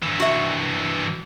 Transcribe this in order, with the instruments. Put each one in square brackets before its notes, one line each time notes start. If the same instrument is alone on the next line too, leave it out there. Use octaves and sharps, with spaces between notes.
[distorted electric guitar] G2 E3
[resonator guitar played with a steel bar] F#4 E5